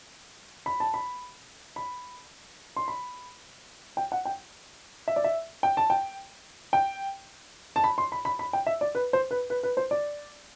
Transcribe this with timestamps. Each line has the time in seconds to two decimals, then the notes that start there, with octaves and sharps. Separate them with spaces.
0.66 B5
0.80 A5
0.94 B5
1.76 B5
2.76 C6
2.88 B5
3.97 G5
4.12 F#5
4.25 G5
5.08 E5
5.16 D5
5.24 E5
5.63 G5
5.77 A5
5.90 G5
6.73 G5
7.76 A5
7.84 B5
7.98 C6
8.12 B5
8.25 B5
8.39 B5
8.53 G5
8.67 E5
8.81 D5
8.95 B4
9.13 C5
9.31 B4
9.50 B4
9.63 B4
9.77 C5
9.91 D5